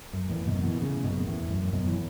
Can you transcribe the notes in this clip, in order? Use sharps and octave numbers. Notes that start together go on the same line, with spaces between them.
F#2
E2 A2
F#2 B2
B2 E3
A2 C#3
F#2 B2
B2
E2 A2
F#2
F#2 B2
E3